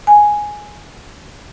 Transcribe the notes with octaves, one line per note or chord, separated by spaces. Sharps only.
G#5